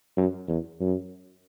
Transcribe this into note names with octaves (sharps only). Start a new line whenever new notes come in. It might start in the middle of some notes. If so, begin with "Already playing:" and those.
F#2
E2
F#2